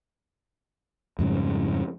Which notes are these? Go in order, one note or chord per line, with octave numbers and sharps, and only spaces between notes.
F2 G#2 C#3 G3